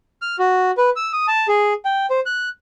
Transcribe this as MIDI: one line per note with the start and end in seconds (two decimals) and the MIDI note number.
0.22 0.36 89
0.39 0.71 66
0.78 0.90 71
0.96 1.12 88
1.13 1.26 87
1.28 1.47 81
1.48 1.73 68
1.85 2.06 79
2.10 2.20 72
2.26 2.49 90